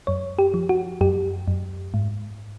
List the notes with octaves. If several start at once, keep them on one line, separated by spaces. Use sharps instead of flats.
F#2 C#5
G4
F3
F#4
F#2 G4
F#2
G#2